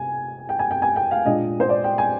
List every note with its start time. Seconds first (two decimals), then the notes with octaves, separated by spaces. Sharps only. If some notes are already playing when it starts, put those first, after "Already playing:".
Already playing: C3 G#5
0.49 G5
0.59 G#5
0.71 G5
0.82 G#5
0.96 G5
1.11 F5
1.25 A#2 G#3 D4 D#5
1.60 C5
1.69 D5
1.84 G5
1.98 G#5